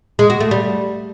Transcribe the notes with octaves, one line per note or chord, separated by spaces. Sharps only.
G#3
F#4
A3
G3